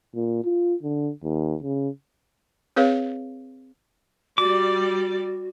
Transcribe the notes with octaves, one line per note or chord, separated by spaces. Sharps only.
A#2
F4
D3
D#2
C#3
C4 G#4 B4 C#5 F5
G3 F#4 D5 D6